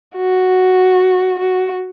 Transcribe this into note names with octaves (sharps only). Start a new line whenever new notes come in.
F#4
F#4